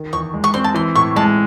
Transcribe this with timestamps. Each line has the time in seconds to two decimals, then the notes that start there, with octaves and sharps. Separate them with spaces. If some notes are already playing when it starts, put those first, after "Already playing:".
Already playing: D#3
0.13 E2 C#6
0.34 G#3
0.44 C#6
0.54 C4 C6
0.64 A5
0.74 E3 C6
0.95 A2 C#6
1.16 G#3 A5